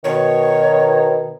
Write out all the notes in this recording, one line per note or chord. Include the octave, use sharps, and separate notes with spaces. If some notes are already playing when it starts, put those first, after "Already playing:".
B2 D#3 C#5